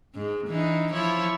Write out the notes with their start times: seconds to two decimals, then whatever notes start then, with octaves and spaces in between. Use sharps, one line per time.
0.15 G#2
0.48 E3 D4 D#4
0.93 F3 E4 C#5